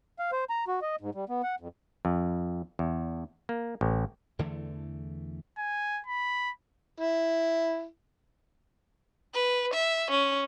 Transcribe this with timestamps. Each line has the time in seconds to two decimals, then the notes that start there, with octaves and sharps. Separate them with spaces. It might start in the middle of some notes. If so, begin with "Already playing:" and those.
0.19 F5
0.32 C5
0.50 A#5
0.68 F#4
0.82 D#5
1.01 G#2
1.15 G3
1.29 B3
1.43 F#5
1.60 F2
2.05 F2
2.79 E2
3.49 A#3
3.81 A1
4.39 E2 D3 E3 A3
5.58 G#5
6.07 B5
7.00 E4
9.34 B4
9.73 E5
10.11 C#4